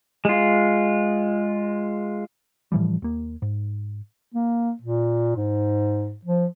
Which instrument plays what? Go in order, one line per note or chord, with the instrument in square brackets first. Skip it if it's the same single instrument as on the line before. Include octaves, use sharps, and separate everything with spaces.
[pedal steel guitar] G#3 F4
[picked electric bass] A2 E3 F3 G3
D#2 A#3
G#2
[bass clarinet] A#3
A#2
G#2
F3